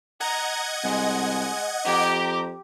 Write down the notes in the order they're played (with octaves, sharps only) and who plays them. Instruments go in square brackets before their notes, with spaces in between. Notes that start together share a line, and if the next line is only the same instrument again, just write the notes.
[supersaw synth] D#5 F#5 G#6 [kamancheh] A#5
[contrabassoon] C2 [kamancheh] G#3 G#5
[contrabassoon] F2 [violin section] G4 [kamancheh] A#5 D6